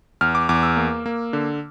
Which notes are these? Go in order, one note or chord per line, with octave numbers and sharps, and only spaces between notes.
E2 F6
D6
E2 D6
E6
A#3
A#3
D3